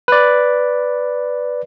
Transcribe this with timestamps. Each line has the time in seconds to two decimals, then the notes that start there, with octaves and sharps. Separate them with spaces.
0.08 B4 D5